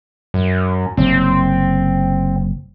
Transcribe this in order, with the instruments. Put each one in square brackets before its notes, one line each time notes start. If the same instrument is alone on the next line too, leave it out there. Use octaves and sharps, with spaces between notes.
[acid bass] F#2
[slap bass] F#1 C3 [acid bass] C4